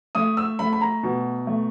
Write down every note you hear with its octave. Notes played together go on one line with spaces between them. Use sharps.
A3 D#6
E6
A3 B5
B5
A#5
B2
A3